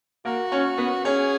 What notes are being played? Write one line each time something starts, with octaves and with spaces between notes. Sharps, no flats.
A#3 F#4 A#4
C#4 C#5
B3 B4
C#4 G#4 C#5